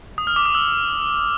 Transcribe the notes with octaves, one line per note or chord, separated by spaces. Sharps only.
D#6
F6
D6
D#6
E6